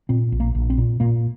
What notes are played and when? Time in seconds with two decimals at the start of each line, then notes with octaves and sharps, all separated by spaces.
0.09 A#2 C4
0.32 A#1
0.40 A#3
0.55 A#1
0.70 C4
0.78 A#2
1.00 A#2 A#3